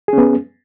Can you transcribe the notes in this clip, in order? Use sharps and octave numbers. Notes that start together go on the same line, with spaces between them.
B3 C#4 G#4